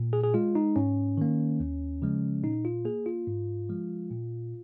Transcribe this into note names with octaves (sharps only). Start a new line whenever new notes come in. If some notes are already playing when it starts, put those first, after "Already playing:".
Already playing: A#2
G#4
G#4
G#3 F4
D#4
G#2 C#4
D#3 A#3
D#2
C#3 F3 G#3
A#2 D#4
F4
A#3 G#4
F4
G#2
F3 G#3
A#2